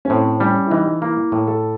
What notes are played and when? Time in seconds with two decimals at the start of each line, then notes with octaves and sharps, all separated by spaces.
0.05 C#4
0.10 A2 C4
0.40 G3 C#4
0.67 E4
0.70 E3 D#4
1.02 A#3 E4
1.32 A2
1.47 A4